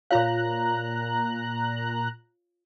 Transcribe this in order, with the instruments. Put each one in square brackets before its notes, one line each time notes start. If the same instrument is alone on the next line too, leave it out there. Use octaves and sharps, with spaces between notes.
[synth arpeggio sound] A#2 A#5 F#6 [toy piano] F4 C#5 F5